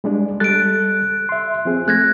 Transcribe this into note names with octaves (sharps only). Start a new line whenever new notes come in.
G3 G#3 D4
G3 A4 F#6 A6 D7
E5 C6
F3 C4 G#4
A3 F#6 G#6 A#6